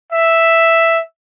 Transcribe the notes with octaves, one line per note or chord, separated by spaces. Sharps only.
E5